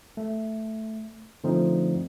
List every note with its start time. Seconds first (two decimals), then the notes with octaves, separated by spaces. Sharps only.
0.17 A3
1.44 D3 F3 A3 C4 D#4